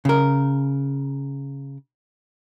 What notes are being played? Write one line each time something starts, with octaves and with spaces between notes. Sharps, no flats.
C#3 A#4